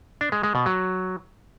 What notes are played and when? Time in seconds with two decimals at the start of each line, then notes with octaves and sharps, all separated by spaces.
0.21 D4
0.32 G#3
0.43 G#3
0.55 B2
0.66 F#3